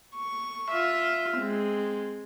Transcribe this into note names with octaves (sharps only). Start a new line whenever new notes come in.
C#6
F4 E5
G#3 C4